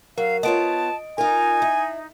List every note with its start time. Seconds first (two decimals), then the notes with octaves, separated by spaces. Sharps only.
0.18 F#3 A#4 F5
0.43 B3 F4 C#5 D#5 A5 D7
1.18 D#4 F4 A#4 G#5
1.62 E4